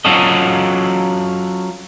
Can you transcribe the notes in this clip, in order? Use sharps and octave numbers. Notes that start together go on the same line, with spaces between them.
F#3 C#4 F4 F#4 A4 D#5